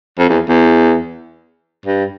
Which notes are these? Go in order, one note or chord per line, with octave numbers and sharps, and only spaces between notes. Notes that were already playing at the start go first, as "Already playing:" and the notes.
F2
E2
E2
G2